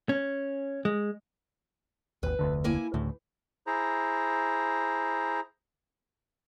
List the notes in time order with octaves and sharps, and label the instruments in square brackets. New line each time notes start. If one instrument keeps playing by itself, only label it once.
[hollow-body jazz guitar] C#4
G#3
[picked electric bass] G#1 D#2 [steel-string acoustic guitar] B4
[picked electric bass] F1 D2 D3
[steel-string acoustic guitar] A#3 E4 G#5
[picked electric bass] D2 A2 [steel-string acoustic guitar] C#3
[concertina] E4 G#4 C5 A#5